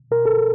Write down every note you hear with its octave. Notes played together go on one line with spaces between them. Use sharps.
B2 A#4
A4